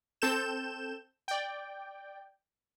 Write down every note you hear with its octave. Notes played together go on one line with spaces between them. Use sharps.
C4 A4 G6 E7
D5 G5